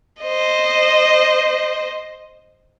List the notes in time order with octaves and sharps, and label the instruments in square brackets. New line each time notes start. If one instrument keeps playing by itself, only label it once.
[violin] C5 D#5